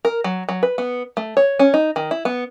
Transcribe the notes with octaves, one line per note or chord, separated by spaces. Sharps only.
A#4
F#3
F#3
B4
B3
A3
C#5
C#4
D#4
D#3
E4
B3